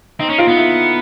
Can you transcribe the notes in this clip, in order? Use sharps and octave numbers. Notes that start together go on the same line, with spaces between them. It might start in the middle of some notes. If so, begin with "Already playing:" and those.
C4 D#4
C#4
C4 F4
B3 D#4
E4